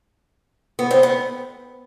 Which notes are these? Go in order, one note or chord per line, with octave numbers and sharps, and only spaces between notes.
B3
C4
B3